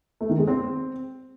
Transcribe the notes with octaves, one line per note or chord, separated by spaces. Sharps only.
A3
D#3
G#3
C4